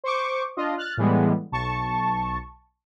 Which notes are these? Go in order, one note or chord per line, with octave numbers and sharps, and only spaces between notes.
C5 C#6 D6
D4 F4 D#5
F6 F#6 A6
A2 E3 G3 G#3 B3
B1 A5 C#6